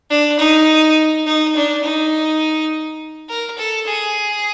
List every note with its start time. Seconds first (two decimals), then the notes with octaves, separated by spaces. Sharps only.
0.10 D4
0.39 D#4
1.26 D#4
1.55 D4
1.84 D#4
3.29 A#4
3.58 A4
3.87 G#4